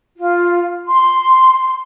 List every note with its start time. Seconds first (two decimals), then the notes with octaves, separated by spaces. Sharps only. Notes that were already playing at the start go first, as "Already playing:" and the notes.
0.17 F4
0.86 C6